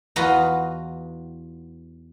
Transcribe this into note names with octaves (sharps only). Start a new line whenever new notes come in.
E2 F4 F#4 B4 D#5 A#5